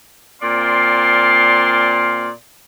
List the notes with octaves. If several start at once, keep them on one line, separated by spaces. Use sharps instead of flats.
A#2 C4 D5 F5 C6